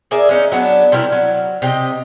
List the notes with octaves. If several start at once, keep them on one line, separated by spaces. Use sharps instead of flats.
G#4 A#4 D5 E5
G#3 C#4 D#4
F#3 B3 D4
C3 G3 E4 A#4
F#3
C3 G4 D#5